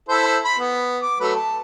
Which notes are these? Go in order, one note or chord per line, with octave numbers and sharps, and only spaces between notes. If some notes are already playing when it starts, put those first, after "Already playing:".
E4 A4 C5
B5 C6
B3
D6
F#3 A3 B4
A5